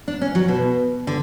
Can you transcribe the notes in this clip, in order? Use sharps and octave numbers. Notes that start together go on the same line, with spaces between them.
D4
C#4
F#3
B2
D3